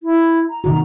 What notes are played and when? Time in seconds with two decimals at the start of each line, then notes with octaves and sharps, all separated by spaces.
0.03 E4
0.50 A#5
0.64 C3 D#3 F#4